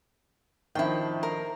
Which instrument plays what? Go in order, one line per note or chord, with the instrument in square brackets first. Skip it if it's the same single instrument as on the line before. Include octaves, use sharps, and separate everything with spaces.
[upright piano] D#3 F3 D4 [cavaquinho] E4 G5
[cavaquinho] A#4